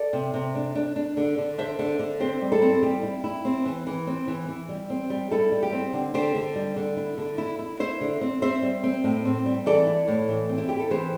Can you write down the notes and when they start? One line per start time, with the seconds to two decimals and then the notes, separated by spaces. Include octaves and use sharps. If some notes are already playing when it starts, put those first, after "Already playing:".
Already playing: A4 D5
0.13 C3
0.34 C3
0.55 D4
0.75 D4
0.96 D4
1.17 D3
1.38 D3
1.58 D4 C5 E5
1.79 D3
1.99 D3
2.20 C4 G4 C5
2.41 G3
2.52 E4 A4
2.62 C4
2.83 G3 G4
3.03 E4
3.24 E4
3.45 C4
3.66 E3
3.87 E3
4.07 C4
4.28 E3
4.49 E3
4.69 G3
4.90 C4
5.10 G3
5.31 G3 E4 A4
5.52 G3
5.63 G4
5.72 C4
5.93 D3
6.14 D3 G4 C5
6.35 D3
6.56 G3
6.76 D3
6.97 E4
7.18 D3
7.38 E4
7.59 E4
7.80 E4 C5 E5
8.01 D3
8.21 C4
8.42 C4 C5 E5
8.63 G3
8.83 C4
9.04 A2
9.25 C4
9.46 G3
9.66 E3 A4 D5
9.87 E4
10.08 A2
10.29 E3
10.49 C4
10.58 E4
10.69 E4 G4
10.80 A4
10.90 E3 G4 C5